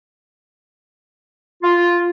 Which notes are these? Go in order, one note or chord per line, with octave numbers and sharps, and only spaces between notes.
F4